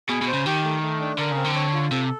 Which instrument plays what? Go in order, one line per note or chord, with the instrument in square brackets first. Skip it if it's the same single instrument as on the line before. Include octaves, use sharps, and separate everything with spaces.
[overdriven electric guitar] B2 [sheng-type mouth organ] G#4
[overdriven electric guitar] B2
[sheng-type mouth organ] C5
[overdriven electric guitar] C#3
[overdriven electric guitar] D#3 [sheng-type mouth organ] G4
[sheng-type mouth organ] A3
A3
D4
[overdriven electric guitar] D3 [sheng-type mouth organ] A#4
[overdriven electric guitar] C#3 [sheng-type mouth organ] C4
[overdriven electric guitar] D3
[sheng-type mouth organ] C#5
F4
[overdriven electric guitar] C3 [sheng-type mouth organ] A4